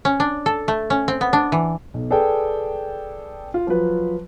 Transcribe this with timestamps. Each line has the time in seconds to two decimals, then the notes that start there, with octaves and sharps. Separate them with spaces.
0.05 C#4
0.20 D4
0.46 A4
0.68 A3
0.90 C#4
1.08 C4
1.21 B3
1.33 D4
1.52 E3
1.94 B1
2.10 G#4 A4 B4 D5 G5
3.54 F4
3.67 F3 F#3 F4 B4